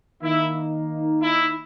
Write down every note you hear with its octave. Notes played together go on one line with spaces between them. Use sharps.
D#3 A#3 D#4 E4
E4